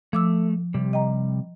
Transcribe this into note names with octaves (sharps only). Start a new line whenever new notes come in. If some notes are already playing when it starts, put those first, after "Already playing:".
F3 A3 D6 E6
C3 G3
D#5 G5 A#5